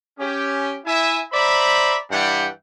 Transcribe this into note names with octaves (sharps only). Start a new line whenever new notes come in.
C#4 G4
E4 E5 G#5
C5 D5 E5 A#5 B5
G2 E3 G3 F#5 G5